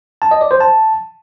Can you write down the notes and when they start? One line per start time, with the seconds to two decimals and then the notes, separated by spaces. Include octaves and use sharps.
0.22 A5
0.31 D#5
0.41 D5
0.51 C5
0.60 A5